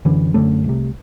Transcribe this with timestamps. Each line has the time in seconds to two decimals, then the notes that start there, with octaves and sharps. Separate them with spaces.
0.05 F#2 D3 E3
0.34 F#2 D3 A3
0.64 C2 C3